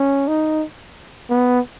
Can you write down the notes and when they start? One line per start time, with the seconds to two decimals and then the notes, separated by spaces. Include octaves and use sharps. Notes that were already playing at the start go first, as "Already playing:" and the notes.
Already playing: C#4
0.28 D#4
1.30 B3